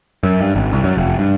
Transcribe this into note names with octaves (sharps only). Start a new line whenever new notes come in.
F#2
G2
G#1
C2
F#2
F1
G2